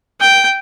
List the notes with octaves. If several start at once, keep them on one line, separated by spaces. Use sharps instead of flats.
G5